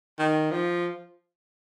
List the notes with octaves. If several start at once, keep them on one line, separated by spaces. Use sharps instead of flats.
D#3
F3